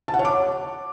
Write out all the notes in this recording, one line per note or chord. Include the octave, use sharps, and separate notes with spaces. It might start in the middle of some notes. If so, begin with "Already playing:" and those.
A5
F#5
C#5
D6